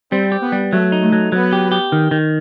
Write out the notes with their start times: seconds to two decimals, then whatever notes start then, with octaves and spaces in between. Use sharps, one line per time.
0.12 G3 C4
0.32 G4
0.43 B3
0.52 G3
0.72 F#3 A3
0.92 D#4
1.02 A3
1.12 F#3
1.32 F#3 B3
1.53 G4
1.72 G4
1.92 D#3
2.11 D#3